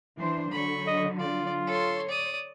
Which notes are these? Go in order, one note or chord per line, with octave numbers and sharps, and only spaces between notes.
E3 D4 C5
D3 F#3 B5 C#6
D#5
F4 D5
A4 C#5 C6
D5 D#6